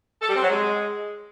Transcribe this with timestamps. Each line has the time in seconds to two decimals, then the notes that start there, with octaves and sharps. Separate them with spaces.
0.21 A4
0.28 G3
0.35 C4
0.42 F#3
0.49 G#3